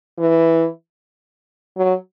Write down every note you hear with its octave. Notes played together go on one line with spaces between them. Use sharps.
E3
F#3